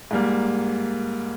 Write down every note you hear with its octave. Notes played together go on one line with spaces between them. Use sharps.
G#2 G3 A#3